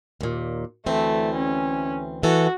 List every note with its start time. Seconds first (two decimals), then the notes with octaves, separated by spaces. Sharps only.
0.21 D#2 A#2
0.87 D2 E3 A3 C4
1.35 C#4
2.23 E3 F#4 A4